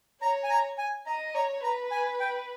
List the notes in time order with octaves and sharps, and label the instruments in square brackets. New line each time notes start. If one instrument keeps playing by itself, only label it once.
[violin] C#5 [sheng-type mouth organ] A#5
[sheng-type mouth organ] G#5
A#5
G#5
[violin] D#5 [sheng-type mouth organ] A#5
[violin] C#5 [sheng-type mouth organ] A#5
[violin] B4 [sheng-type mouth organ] A#5
[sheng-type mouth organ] G#5
G5